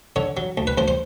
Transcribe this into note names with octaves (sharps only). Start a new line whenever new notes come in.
D3 C#5
F#3
D2
B4
D2 C5
C5